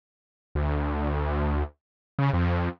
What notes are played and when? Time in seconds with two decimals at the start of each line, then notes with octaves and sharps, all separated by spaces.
0.55 D2
2.19 C#3
2.33 F2